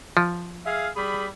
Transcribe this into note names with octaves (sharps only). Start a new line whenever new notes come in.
F3
G#4 E5 F5
G3 G#4 B5